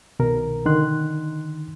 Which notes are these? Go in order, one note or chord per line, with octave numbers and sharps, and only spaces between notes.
C2 B2 D#3 A#4
D3 D#3 C6 F#6